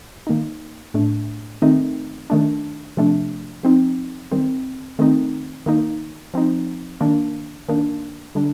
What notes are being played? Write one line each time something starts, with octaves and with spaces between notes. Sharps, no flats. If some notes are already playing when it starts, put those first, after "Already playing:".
D#3 A#3 D#4
A2 A3 D4
D#3 A3 C4 D#4
D#3 A3 D4
C3 F3 A3 D4
F3 C4 D#4
D#3 G3 C4
D#3 A3 C4 D#4
D#3 A#3 D#4
F3 C4 D#4
D#3 A#3 D4
D#3 A#3 D4
D3 G3 D4